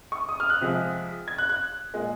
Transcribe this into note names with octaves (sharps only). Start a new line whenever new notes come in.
C#6
D#6
F6
F#6
C3 F3 G#3
G#6
F#6
F#6
A#2 G#3